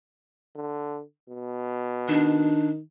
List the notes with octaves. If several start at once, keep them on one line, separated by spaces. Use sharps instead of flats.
D3
B2
D#3 D4